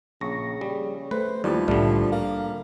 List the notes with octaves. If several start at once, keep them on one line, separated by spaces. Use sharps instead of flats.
A#1 C#3 C#6 A#6
G3 G#4
A3 B4 C5
D#2 E3 F3 G3
C2 A2 D3 G3 A3
A#3 F5